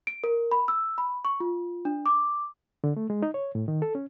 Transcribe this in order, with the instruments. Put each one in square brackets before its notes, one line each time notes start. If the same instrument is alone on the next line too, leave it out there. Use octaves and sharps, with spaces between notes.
[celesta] D7
A#4
B5
E6
B5
C#6
F4
D4
D6
[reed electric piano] D3
A3
G#3
D#4
C#5
A2
D#3
A4
C#4